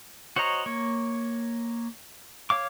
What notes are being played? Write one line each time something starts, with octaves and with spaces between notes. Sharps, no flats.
F#4 C5 C#5 D#5 A#5
A#3 C#5
C#5 F5 D6